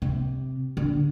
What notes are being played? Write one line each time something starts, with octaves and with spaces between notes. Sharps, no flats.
C3
D3